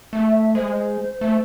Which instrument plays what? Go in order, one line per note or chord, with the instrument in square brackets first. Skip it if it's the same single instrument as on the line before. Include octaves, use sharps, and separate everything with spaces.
[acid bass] A3
[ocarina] E5
[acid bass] G#3 [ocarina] C5
[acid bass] A3